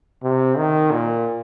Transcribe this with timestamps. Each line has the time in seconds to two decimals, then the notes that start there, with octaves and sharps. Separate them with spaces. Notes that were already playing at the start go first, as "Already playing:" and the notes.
0.23 C3
0.57 D#3
0.91 A#2